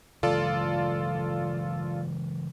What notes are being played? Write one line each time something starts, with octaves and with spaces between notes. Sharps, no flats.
C#3 E3 G#3 F4 A4 D5